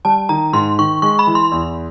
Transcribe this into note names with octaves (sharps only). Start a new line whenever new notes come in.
G3 A5
D#3 A#5
G#2 C6
D#3 C#6
G#3 C#6
B5
E3
C6
E2